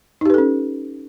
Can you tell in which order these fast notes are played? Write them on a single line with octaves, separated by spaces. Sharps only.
D#4 G4 B4 A4 C#4